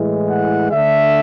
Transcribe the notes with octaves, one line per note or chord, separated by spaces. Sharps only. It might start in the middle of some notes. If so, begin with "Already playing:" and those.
Already playing: A2 E3 G#3
F#5
D3 A3 E5